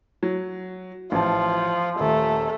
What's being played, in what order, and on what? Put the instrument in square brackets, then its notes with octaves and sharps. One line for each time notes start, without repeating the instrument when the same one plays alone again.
[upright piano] F#3
[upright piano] A1 A5 [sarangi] F3
[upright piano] D#1 [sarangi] A3